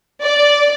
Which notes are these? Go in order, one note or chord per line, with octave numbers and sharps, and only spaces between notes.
D5